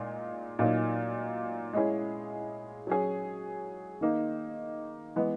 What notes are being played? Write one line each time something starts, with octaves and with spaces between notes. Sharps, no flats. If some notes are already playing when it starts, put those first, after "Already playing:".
Already playing: A#2 G#3 D#4
A#2 F#3 A#3 D#4
G#3 C#4 E4 G#4
F#3 C#4 G#4
D#3 A#3 D#4
E3 G#3 B3